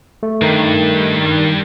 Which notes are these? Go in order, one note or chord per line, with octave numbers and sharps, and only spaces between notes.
A3
G2 D#3